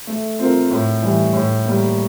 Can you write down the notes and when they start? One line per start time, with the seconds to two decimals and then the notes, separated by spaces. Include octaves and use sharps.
0.07 A3
0.39 C4 F4 A#4
0.71 A2
1.03 E3 G3
1.33 A2
1.65 G3 A#3